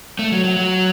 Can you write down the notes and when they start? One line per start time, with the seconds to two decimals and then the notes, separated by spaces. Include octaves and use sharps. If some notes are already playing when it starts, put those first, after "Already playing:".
0.19 A3
0.32 F#3
0.44 F#3
0.56 F#3